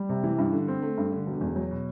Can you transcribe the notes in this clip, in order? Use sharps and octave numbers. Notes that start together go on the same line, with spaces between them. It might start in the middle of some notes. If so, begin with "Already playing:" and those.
Already playing: G3
C3
E3
G2
D3
C4
A3
G2
D3
E1
E2
F#3
B2